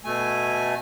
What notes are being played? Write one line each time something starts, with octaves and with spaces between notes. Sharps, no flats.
B2 A3 G#5